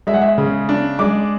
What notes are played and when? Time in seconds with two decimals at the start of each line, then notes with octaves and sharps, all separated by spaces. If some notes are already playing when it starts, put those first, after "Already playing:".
0.07 G#3 E5
0.14 F#5
0.21 E5
0.38 C#3
0.69 D4
0.99 G#3 D6